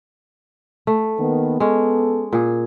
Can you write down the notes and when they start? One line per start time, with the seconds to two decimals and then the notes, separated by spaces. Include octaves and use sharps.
0.87 A3
1.19 D#3 A#3 B3
1.60 G#3 B3 C#4 A4
2.33 A#2 G#4